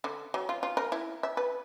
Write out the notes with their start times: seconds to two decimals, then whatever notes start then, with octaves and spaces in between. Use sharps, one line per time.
0.04 D3
0.34 F#3
0.49 F4
0.63 F4
0.77 A#4
0.92 E4
1.23 E5
1.37 B4